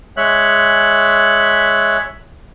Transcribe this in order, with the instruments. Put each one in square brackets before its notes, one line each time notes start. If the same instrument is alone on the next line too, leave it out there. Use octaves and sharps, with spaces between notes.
[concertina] G#3 C#5 E5 F#6